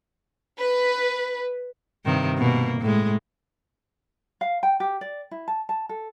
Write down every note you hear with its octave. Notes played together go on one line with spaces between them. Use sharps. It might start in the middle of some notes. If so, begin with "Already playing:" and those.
B4
G2 C3 D#3
B2 A#3
A2 G#3
F5
G5
G4
D5
E4
A5
A5
A4